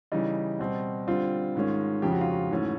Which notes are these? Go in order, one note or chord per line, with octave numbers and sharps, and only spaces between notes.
C#3 E3 G3 D#4
B2 G3 C4
D3 G3 C4 F4
G#2 D#3 G#3 C#4
F2 C#3 F3 G4
F#4
F4
F#4
G#2 E3 A3 C#4